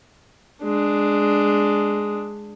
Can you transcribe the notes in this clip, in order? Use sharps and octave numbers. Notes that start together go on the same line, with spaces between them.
G#3 D4